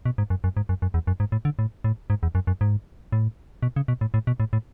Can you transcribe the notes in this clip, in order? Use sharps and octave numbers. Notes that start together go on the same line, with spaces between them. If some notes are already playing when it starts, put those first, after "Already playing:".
B2
G#2
F#2
F#2
G#2
F#2
F#2
E2
F#2
G#2
A2
D3
A2
A2
G#2
E2
F#2
F#2
G#2
A2
B2
C#3
B2
A2
A2
B2
A2
A2